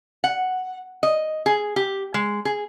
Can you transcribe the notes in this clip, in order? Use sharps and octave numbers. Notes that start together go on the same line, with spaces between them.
F#5
D#5
G#4
G4
G#3
G#4